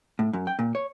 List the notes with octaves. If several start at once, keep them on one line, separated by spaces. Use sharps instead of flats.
A2
F#2
G5
A#2
C#5